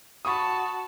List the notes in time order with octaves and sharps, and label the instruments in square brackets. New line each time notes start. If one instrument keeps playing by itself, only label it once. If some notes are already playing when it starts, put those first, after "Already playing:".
[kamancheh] F#4 A5 [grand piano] B5 C#6 D#6